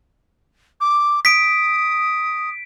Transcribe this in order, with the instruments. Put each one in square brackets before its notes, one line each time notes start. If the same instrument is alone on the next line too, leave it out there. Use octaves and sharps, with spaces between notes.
[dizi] D6
[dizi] D#6 [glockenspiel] B6 D7